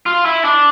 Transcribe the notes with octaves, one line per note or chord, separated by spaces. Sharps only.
F4
E4
D4